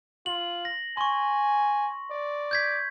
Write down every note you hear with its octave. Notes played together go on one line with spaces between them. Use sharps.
F4 F#7
A#6
G#5 C6 C#6
D5
G6 G#6 B6